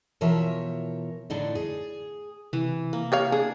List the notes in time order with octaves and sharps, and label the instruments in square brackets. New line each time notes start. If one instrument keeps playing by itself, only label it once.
[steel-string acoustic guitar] B2 E3 F3 A#4 C#5 E5
A2 D3 D4 D#4
G#4
[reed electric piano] C3 [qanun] E3
[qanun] A#3
[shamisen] G4 C#5 F5
[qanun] D4 [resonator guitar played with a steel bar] G#4